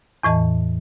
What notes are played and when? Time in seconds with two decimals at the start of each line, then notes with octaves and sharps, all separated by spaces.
0.23 E2 A2 E3 D#5 A5